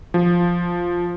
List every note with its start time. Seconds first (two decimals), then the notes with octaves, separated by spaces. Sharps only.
0.14 F3